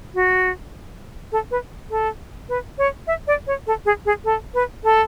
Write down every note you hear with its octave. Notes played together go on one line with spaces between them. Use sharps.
F#4
A4
B4
A4
B4
C#5
E5
D5
C#5
A4
G#4
G#4
A4
B4
A4